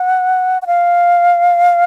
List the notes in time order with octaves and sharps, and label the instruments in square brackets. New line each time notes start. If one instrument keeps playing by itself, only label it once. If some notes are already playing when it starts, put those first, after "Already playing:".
Already playing: [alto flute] F#5
F#5
F5